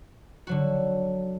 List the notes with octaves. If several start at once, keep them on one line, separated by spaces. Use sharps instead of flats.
D3 F#3 F#4